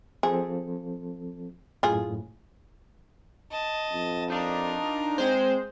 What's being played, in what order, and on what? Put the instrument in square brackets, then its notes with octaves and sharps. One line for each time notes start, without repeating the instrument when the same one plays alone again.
[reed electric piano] F3 C4 A4 [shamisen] G#4
[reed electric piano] F#2 A2 [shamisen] F4 G#4
[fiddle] D#5 A5
[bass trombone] F2
[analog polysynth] D4 D#4 [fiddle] F4 A#4
[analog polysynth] G#3 C5 [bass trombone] C4